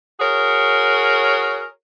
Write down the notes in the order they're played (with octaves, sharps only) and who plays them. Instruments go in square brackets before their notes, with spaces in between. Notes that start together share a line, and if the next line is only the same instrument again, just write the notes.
[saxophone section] F#4 G#4 A#4 C#5